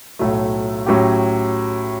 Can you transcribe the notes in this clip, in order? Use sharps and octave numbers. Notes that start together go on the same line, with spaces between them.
B1 A2 F#3 A3
A2 F#3 C#4 G4